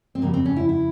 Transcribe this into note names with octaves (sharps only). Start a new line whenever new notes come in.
C4
F2 C#3 G3 A#3
C4
C#4
E4
E4